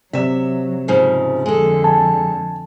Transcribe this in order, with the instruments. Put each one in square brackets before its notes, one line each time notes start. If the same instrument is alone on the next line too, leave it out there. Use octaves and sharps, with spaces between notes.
[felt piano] C3 D5 E7 [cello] F#3 [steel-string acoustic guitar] E5
[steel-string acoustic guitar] G#2 C#3 F3
[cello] F2 D3 [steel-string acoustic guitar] G#3 A4
[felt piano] G#5 [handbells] A5